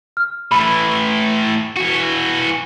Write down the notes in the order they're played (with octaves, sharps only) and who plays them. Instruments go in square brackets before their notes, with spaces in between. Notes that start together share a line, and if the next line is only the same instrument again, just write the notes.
[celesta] F6
[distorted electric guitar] A2 E3 [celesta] B5
[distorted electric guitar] E3 F#4